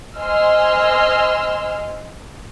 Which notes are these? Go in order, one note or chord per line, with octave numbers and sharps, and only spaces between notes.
C5 D#5 G#5 C6 E6 F6